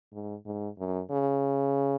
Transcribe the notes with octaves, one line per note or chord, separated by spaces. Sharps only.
G#2
G#2
F#2
C#3